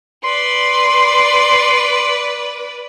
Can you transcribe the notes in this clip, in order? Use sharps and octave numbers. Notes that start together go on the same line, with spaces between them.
B4 D5 C6